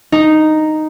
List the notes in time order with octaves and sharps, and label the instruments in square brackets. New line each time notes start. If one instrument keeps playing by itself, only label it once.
[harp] D#4